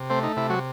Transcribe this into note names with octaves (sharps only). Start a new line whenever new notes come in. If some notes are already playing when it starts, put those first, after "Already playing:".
Already playing: C3
A3 C4 C5
D#4
C3 E4
F#3 F#4